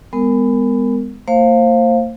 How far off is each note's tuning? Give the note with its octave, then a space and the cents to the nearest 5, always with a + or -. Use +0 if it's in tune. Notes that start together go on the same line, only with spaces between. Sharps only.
G#3 -20 B3 +20 A#4 -15
A#3 -45 C5 +20 F5 +0